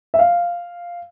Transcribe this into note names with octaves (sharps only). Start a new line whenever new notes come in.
E5
F5